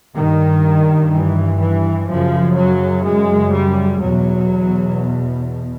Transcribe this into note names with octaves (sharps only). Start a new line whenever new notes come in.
G2 D#3
E3
E3
F#2 C#3 F3
F#3
G#3
G3
E2 B2 F#3